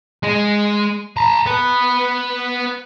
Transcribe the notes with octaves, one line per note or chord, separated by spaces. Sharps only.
G#3
A5 A#5
B3 B4